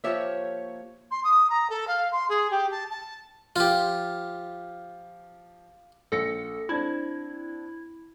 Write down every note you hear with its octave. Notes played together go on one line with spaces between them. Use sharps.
F3 A#3 G4 C#5 E5
C6
D#6
A#5
A4
F5
C6
G#4
G4
A5
A5
F3 F4 G4
A#1 A4 A#6 C#7
C4 D4 E4 G#6